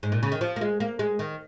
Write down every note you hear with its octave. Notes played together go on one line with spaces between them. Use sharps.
G#2
A#2
C#3
D#3
F3
A#3
G#3
A#3
G#3
D#3